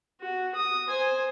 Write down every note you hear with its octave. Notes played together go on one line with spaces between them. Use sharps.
F#4
D#6
C5 G#5